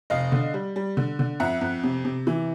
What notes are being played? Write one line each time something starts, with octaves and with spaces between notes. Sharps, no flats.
F1 D#5 F5
D3
G3
G3
D3
D3
F2 E5 F#5
F2
C3
C3
E3